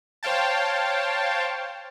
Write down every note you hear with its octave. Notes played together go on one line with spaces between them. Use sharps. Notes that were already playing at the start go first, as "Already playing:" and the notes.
C5 C#5 F5 G5 A5